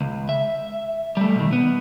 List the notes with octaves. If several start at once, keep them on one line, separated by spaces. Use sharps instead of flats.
C#2
E5
G3 A3
B2 D#3
B3